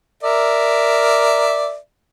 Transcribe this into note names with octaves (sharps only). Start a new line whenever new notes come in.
A#4 D5 E5